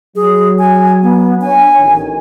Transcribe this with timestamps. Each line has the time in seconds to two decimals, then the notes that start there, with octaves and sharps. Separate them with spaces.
0.16 F#3 G#4
0.59 G#5
1.02 B3
1.41 D4 C#5 G#5
1.79 A1 D#3